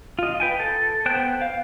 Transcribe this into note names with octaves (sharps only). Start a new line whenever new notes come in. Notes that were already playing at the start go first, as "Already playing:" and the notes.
F4 D#5
B4 G5 G#5
A4
B3 C5 G5 F#6
F5